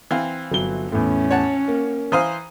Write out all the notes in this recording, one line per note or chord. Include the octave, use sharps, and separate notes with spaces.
E3 C4 F5
G1 F#3 G7
E2 A2 C#4
C#5 F#5 A5
A#3
E3 C5 F5 A#5 D#6 D#7